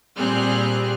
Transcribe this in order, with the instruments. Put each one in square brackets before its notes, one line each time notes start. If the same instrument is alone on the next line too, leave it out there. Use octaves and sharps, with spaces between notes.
[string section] A#2 G3 C4 G#4 F6 F#6